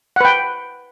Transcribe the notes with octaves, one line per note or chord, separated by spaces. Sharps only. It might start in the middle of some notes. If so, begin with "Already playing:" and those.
B4 F#5 G5